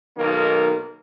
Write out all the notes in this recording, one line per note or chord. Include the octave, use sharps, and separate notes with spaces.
B1 D#3 A#3 A#4